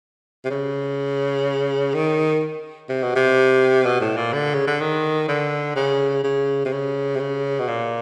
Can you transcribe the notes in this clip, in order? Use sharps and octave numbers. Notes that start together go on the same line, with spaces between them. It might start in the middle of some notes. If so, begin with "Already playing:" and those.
C3
C#3
D#3
C3
B2
C3
B2
A2
A#2
D3
C#3
D3
D#3
D3
C#3
C#3
C3
C#3
C3
C#3
B2
A#2